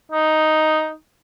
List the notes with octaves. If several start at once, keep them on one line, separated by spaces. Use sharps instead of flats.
D#4